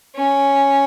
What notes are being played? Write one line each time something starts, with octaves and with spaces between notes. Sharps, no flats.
C#4